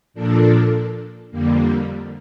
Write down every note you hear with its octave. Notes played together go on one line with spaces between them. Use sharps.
A#2 F3 A#3 D4 A4
F2 D3 G3 A#3